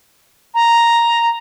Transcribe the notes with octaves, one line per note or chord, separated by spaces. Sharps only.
A#5